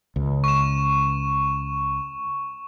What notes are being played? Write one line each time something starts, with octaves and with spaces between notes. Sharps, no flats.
C#2
C#6 E7